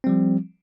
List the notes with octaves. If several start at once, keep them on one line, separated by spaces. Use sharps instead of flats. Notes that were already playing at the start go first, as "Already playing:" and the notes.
F3 G3 C4